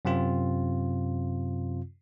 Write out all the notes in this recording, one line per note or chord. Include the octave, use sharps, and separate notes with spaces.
F#2 C3 C4 F4